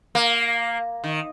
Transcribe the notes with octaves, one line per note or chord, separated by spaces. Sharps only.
A#3
D#3